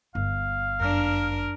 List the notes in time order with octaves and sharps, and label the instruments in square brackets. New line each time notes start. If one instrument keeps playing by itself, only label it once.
[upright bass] G1 [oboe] F5
[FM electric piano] F#2 F6 [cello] D4 A#4